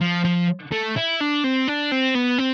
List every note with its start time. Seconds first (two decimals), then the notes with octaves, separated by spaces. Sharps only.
0.01 F3
0.25 F3
0.72 A3
0.96 E4
1.20 D4
1.44 C4
1.68 D4
1.92 C4
2.15 B3
2.39 C4